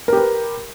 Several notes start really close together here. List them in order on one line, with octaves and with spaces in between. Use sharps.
A#4 G4 B4